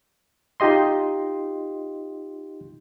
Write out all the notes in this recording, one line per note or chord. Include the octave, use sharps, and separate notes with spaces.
D#4 F4 G4 D#5 C6